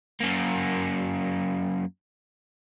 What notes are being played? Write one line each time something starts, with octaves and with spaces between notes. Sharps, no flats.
F#2 A#3